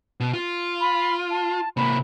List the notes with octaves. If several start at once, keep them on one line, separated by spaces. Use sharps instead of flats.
B2
F4
B5
A5
C3 A#3 B5